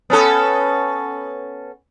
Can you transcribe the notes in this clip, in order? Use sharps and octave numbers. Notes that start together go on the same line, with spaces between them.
B3 C#4 A4